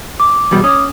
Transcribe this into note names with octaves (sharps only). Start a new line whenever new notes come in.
D6
E2 B2 G3
C#4 D6 D#6